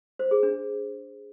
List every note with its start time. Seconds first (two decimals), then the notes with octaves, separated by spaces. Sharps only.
0.19 C5
0.31 G#4
0.43 D4